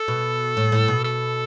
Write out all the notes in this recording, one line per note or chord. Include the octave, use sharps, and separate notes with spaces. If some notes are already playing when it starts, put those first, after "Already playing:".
Already playing: A4
B2
A2
A2
B2
A4